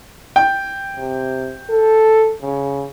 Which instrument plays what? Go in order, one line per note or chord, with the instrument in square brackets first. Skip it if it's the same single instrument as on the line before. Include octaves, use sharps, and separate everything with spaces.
[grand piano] G5
[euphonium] C3
A4
C#3